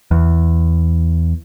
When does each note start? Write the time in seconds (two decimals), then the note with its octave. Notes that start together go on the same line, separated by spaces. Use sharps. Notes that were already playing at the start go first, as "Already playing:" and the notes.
0.11 E2